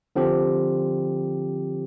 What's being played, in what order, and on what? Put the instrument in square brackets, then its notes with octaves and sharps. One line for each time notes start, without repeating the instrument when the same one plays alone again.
[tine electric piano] D3 F3 C4 G4